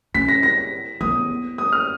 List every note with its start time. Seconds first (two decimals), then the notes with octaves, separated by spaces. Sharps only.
0.14 C#4 B6
0.28 A#6
0.43 A#6
1.01 B3 D#6
1.58 D#6
1.72 F6